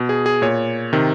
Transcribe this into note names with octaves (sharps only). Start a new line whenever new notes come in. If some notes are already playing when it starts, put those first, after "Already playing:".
Already playing: B2
G#4
G#4
A#2 C#5
C3 D#3